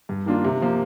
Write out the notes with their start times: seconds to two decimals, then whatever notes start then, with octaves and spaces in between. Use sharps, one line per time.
0.09 G2
0.26 D#3 A#3 D4 F4
0.44 C3
0.62 F3 A#3